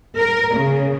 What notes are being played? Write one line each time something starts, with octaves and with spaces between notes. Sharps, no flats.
A#4
C#3